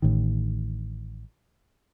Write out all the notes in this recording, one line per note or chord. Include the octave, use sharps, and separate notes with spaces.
A1 A2 D#3